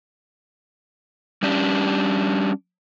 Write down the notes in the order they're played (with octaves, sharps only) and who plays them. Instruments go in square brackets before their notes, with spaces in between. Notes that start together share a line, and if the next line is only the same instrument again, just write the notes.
[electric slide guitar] G3 C#4 D4 G4